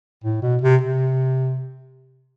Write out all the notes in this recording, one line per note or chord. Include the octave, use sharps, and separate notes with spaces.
A2
B2
C3
C3